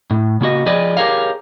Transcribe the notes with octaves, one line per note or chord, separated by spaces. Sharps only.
A2
C#3 A#3 F#4 D#5
F3 G#4 B4 D5 D#5
G4 G#4 A#4 C#5 F5